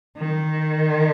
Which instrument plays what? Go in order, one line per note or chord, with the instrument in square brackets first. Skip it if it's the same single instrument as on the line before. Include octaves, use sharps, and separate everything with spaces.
[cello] D#3